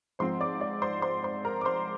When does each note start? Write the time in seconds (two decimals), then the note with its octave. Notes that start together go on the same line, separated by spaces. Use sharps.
0.19 G#2 F3 C4 C5 C6
0.41 D5 D6
0.61 D5 D6
0.82 C5 C6
1.02 C5 C6
1.24 C5 C6
1.45 A#4 A#5
1.61 D6
1.65 C5 C6